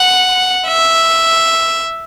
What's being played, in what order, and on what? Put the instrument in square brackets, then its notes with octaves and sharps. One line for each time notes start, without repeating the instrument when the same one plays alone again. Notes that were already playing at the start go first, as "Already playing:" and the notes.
Already playing: [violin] F#5
E5